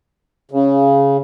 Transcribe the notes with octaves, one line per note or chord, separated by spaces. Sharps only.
C#3